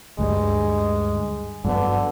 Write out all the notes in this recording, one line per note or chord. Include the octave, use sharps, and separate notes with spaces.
D2 G2 G3 G#3
G2 D3 F#3 B3